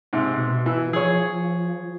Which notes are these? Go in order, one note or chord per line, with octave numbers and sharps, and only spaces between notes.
G#2 C3
B2
E3 E6
F3 G#4 C#5